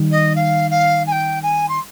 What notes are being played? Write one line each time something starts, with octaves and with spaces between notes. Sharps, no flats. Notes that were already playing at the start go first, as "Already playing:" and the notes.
Already playing: D#3 G3
D#5
F5
F5
G#5
G5
G#5
C6